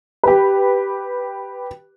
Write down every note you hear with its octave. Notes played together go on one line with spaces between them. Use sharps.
G4 B4